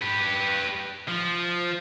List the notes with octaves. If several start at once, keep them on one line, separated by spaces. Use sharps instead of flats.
G4 B4
F3